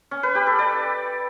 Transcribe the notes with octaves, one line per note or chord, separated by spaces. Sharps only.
C#4
B4
G4
A4
D5